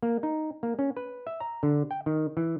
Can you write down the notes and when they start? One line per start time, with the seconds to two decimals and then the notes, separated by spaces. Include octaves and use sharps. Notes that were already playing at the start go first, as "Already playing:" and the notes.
0.03 A#3
0.23 D#4
0.63 A#3
0.79 C#4
0.97 B4
1.27 E5
1.40 A#5
1.63 D3
1.91 G5
2.06 D#3
2.37 E3